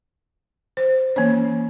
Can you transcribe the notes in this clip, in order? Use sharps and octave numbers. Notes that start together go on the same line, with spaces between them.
C5
E3 A#3 C#4 C#5